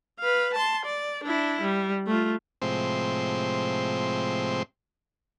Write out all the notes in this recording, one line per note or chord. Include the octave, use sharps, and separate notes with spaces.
B4 F5
A5 C6
D5
D4 E4
G3
A3 F4
A2 C3 F3 G#3 C4 C5